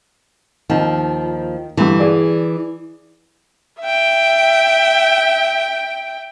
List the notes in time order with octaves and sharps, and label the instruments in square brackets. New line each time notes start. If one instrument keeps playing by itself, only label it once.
[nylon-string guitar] D#2 F3 [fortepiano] D#3
[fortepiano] G2 D3 [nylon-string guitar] E3
[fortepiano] G#4 D5
[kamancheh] E5 G5